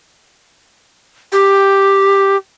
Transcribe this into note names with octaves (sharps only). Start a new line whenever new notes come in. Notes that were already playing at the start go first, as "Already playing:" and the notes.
G4